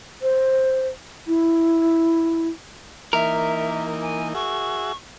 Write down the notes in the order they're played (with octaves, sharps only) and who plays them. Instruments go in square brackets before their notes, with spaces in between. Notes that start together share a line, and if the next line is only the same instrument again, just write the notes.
[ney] C5
E4
[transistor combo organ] E3 A#3 D#4 [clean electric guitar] A#4 [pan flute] E5
[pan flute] G#5
[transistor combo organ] F#4 G#4 E5 [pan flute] C#6